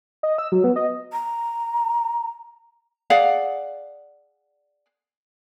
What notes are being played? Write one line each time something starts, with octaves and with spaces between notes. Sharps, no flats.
D#5
E6
F#3
B3
D#5
A#5
G#4 D5 F5 F#5